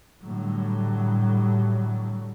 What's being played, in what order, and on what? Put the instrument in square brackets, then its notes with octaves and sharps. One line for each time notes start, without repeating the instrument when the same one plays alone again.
[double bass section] A2 D3 F#3 G3